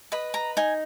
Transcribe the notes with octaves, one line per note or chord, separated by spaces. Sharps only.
B4 D#5 B5
A#5
D#4 G#5